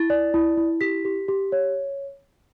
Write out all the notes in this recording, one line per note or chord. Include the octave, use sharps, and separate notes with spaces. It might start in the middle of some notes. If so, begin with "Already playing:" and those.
Already playing: E4 A6
D5
E4
E4
G4 B6
G4
G4
C#5